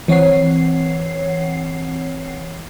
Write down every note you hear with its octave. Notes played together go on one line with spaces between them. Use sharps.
E3 C4 C#5 F#5 C7